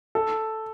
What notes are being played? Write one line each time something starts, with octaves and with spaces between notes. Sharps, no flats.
A4